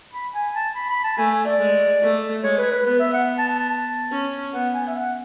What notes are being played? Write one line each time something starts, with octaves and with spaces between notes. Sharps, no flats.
B5
G#5
A5
B5
B5
A5
A3 G#5
G#5
D5
G#3
A3
G#3 C#5
B4
B4
B3 B4
E5
F#5
A5
A5
A5
A5
C#4
B3 F#5
G#5
E5
F#5